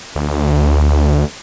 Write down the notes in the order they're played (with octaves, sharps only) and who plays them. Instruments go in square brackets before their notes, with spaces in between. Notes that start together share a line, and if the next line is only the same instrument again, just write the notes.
[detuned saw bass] D2